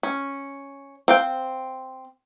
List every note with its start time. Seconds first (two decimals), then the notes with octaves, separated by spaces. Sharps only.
0.03 C#4
1.08 C4 F5 G5